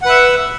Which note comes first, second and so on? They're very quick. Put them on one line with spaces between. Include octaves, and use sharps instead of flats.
F#5 B4 E5